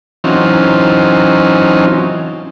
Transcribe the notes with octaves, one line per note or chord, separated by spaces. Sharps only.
E3 F#3 C4 C#4 D#4 F4